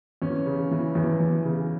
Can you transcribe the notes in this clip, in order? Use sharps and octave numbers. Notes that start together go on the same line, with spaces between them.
E2 C#4
C#3
E3
E2
E2
C#3